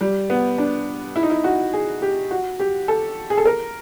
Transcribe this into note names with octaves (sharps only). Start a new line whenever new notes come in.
G3
B3
D4
E4
D#4
E4
F#4
G#4
G4
F#4
G4
A4
G#4
A4
A#4